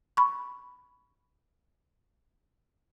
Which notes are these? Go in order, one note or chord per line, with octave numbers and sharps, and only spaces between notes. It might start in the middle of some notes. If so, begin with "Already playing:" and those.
B5 C#6